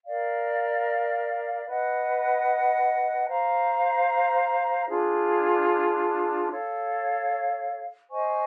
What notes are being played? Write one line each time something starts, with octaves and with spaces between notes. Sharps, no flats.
A#4 D5 F5
B4 D#5 F#5
C5 F5 A#5
D4 F4 G#4
A4 C#5 F5
C5 D#5 G#5 C#6